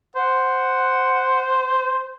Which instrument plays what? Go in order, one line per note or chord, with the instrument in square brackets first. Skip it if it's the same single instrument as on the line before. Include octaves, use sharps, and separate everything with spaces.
[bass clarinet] C5 [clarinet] F#5